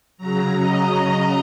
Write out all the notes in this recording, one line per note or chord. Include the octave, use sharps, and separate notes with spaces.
C#3 F#3 A#5
D#5